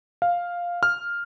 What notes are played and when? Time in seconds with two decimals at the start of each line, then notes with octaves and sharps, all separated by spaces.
0.22 F5
0.83 F6